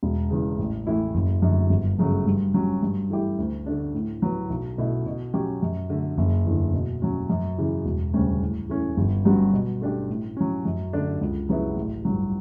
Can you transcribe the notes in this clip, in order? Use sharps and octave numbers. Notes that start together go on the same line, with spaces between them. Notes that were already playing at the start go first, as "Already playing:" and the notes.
E1
E2 C#3
A1
A2 E3 A3 E4
F#1
F#2 D3 A3
G1
F#2 C#3 F#3 A3
G2
F#3 C#4 G4
G2
E3 A3 E4 G4
D2
D3 A3 D4
A2
F#3 B3
B1
B2 A3 E4
B2
F#3 C#4 G4
F#2
D3 A3
F#1
E2 D3
B2
F#3 C#4
F#2
C#3 E3
E1
D2 C#3 G3 C#4
A2
E3 A3 C#4
G1
G2 F#3 C#4 F#4
B2
A3 D4 G4
A2
F#3 C#4
F#2
D3 A3 D4
C#2
C#3 F#3 B3 E4
A1
G2 F#3